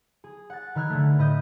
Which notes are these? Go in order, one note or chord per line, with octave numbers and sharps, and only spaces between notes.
G#4
F#5 A6
D#3 B4 F6 F#6 G#6
D3 A3
A2 B4 D#5 G6